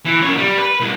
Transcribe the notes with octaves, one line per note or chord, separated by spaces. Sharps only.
E3
F#2 C#5
G3
B4
C2